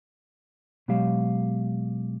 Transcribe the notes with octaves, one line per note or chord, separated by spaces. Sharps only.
B2 F#3 G#3 G4 F5